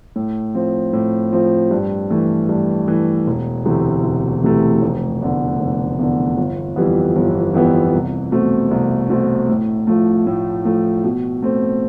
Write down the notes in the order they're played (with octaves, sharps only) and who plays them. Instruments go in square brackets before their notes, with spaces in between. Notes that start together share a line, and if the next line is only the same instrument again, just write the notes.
[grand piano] A2
F3 C4
A2
F3 C4
G2
E3 A3
G2
E3 A3
E1
D2 C3 E3 A3
E1
D2 C3 E3 A3
F1
E2 D3
F1
E2 D3
G1
F2 E3 G3 B3
G1
F2 E3 G3 B3
C2
B2 A3 C4
C2
B2 A3 C4
A2
F3 A3
A2
F3 A3
B2
A3 C4